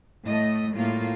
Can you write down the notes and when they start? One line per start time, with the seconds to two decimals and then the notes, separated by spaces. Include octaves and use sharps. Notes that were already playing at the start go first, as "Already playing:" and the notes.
0.24 A2 A3 D#5
0.75 A2 G3 A3 A#3 F4